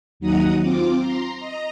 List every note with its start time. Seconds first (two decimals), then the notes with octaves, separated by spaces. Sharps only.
0.20 D#2 F#3 D#4 F#5 A#5 D#6
0.62 C4 F4 D6
1.00 A#5 C6
1.35 D#5 A#5